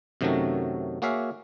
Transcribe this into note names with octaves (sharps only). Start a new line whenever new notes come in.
F#2 C3 D#3 F#3 A3 F#4
A#3 F#4 G#4 C#5 E5 F5